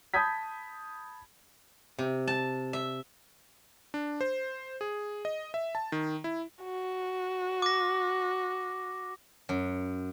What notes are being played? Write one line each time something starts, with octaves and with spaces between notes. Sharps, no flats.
A5 B5 D#6 G6 G#6 B6
C3
A5
E5
D4
C5
G#4
D#5
E5
A5
D#3
E4
F#4
D6 A#6
F#2